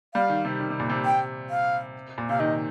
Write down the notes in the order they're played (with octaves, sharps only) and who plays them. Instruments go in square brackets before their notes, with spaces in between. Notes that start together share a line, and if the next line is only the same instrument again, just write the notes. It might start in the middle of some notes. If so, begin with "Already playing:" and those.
[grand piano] G3 [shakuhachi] F5
[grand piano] D#3
C3
D#3
C3
A#2
C3
[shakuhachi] G5
F5
[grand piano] A#2
[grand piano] C3 [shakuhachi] F5
[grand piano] D#3 [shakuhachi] D#5